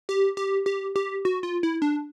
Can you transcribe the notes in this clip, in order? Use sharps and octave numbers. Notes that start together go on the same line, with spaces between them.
G4
G4
G4
G4
F#4
F4
E4
D4